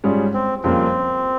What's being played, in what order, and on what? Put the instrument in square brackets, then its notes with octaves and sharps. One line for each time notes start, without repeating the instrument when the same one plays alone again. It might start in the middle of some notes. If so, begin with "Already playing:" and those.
[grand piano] G#2 G3 C#4 F4 G#4
[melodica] C4
[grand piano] F2 C#3 G3 A#3 [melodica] C4